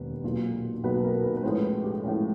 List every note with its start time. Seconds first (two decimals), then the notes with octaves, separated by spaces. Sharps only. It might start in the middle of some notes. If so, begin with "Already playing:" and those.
Already playing: E1 D#2 B4
0.24 B1 A#2 F#3
0.84 B1 A#2 F#3 B4
1.04 A#4
1.23 B4
1.37 B4
1.43 A2 F3 G#3 C#4 C5
1.64 B4
1.84 G4
2.04 A2 F3 G#3 C#4